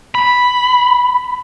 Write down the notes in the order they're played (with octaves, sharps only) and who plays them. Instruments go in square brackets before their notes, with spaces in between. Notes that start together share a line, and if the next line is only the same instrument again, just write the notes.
[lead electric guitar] B5